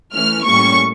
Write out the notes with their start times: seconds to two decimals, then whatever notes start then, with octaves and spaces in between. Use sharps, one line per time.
0.14 E3 A3 C#4 F6
0.46 A2 G3 A#3 C#4 C#6